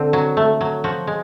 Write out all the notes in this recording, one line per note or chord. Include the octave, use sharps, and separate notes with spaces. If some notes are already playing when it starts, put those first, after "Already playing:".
Already playing: D3 C4
F#3
A3
F#3
F3 F#4
G#3